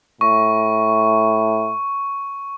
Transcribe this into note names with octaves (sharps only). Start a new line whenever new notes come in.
A2 C#6